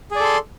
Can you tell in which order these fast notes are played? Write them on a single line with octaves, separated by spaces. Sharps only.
G#4 D5 A4 C6